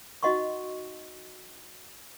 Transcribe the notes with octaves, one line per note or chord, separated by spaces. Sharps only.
D#4 F#4 D#5 F#5 C6 C#6